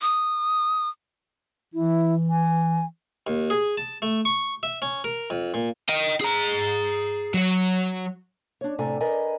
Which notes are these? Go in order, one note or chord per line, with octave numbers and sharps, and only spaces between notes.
D#6
E3 E4
G#5
D#2
G#4
A5
A3
C#6
E5
C#4
A#4
F2
A#2
D#5 G5
G#4 A#5
F#3 C#5
D4 C#5
A2 C3 A4 D5 G#5 A#5
A#4 B4 D5 D#5 G#5 A#5